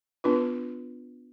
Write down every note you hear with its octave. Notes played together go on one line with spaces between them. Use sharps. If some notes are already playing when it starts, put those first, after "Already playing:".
B3 D4 F4 B4